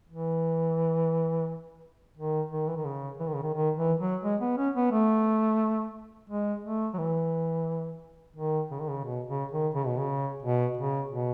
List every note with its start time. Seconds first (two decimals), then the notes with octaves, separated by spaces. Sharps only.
0.09 E3
2.17 D#3
2.51 D#3
2.67 E3
2.77 D#3
2.85 C#3
3.20 E3
3.27 D#3
3.35 C#3
3.43 D#3
3.54 D#3
3.77 E3
4.00 F#3
4.24 G#3
4.41 B3
4.57 C#4
4.75 B3
4.92 A3
6.30 G#3
6.64 A3
6.94 F#3
6.98 E3
8.36 D#3
8.71 C#3
8.80 D#3
8.89 C#3
9.04 B2
9.28 C#3
9.52 D#3
9.74 C#3
9.86 B2
9.98 C#3
10.43 B2
10.77 C#3
11.11 B2